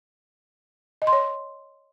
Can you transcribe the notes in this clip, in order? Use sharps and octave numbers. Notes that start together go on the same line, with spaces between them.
D#5
C6
C#5